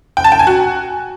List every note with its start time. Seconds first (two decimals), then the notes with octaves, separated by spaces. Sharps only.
0.17 G5
0.24 A5
0.32 G5
0.39 G#5
0.47 F#4